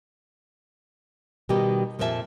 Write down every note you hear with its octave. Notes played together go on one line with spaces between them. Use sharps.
B2 D#3 G3 D#4 G4
F2 A#2 F3 C#4 E5 A5